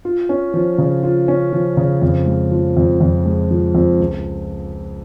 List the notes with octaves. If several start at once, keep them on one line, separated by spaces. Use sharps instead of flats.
F4
C#4
F3
C#3
F4
C#4
F3
C#3
F2
G#3
F3
F2
F2
G#3
F3
F2
C#2